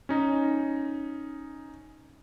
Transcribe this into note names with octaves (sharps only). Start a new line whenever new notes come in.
C#4 D#4